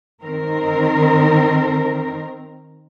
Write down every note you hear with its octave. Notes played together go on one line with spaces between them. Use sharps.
D#3 C4 A#4